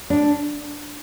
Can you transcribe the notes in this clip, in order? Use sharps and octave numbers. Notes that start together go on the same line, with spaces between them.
D4